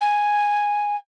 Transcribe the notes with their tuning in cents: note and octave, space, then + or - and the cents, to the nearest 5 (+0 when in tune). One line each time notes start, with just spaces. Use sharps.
G#5 -5